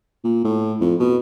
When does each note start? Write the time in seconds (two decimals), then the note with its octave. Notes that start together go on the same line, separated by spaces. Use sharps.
0.24 A#2
0.44 A2
0.81 F2
1.00 B2